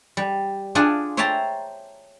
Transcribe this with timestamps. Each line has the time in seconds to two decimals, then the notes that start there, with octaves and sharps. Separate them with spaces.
0.17 G3
0.75 D4 F4 G#4 F#5 G#5 A5
1.17 C5 C#5 E5 G5 A5 A#5